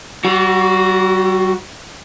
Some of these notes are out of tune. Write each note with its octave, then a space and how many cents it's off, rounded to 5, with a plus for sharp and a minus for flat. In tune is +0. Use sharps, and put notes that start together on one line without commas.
G3 -40 F#4 +0